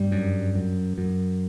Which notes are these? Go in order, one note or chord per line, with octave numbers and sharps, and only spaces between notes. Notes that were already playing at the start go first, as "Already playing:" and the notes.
Already playing: G2 G3
F#2
F#2
F#2